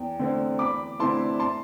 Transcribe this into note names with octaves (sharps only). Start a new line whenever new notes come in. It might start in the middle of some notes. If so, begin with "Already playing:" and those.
Already playing: E2 G5
D3 A3 C4
E2 B5 D6
D3 A3 C4 E4 A5 C6
A5 C6